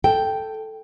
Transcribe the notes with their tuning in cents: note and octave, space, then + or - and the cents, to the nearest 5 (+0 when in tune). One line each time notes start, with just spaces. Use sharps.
A4 +0 G5 +0